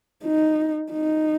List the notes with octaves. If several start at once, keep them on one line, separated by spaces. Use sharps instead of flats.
D#4
D#4